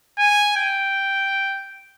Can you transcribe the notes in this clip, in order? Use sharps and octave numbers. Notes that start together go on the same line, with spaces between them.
G#5
G5